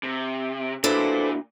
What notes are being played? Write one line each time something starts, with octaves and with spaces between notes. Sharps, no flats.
C3
A#2 D4 E4 F#4 A4 B4 C5